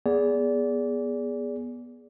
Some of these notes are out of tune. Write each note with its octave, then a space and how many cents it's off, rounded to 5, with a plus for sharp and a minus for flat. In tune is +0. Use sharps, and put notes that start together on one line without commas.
B3 -20 G#4 +0 D5 -25